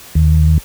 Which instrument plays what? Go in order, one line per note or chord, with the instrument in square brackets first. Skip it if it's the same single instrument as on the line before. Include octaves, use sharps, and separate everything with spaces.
[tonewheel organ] D#2